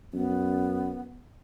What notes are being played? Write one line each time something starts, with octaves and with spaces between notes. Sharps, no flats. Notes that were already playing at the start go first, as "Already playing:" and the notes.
F#2 B3